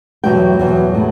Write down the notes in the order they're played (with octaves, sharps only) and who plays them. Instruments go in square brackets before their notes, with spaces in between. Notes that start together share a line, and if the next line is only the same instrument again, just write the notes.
[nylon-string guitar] E2 B2 F#3 G5
E2 B2 F#3
A2